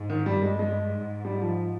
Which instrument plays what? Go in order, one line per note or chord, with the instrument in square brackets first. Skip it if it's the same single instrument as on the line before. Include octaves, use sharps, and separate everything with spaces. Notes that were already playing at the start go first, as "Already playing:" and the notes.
Already playing: [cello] G#2
[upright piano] D#3
[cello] G2 [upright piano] G3
[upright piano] G#3
G#3
[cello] G#2
[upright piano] G3
F3